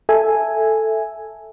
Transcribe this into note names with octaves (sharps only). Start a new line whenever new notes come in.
A4 E5 G#5